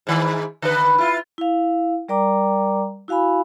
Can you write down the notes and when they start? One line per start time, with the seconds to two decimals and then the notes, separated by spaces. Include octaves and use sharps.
0.07 G#2 D#3
0.62 D3 B4
0.98 E4 F4
1.38 E4 F5
2.09 G3 A#4 D5 G5 A#5 D6
3.08 E4 F#4 F5 G#5 B5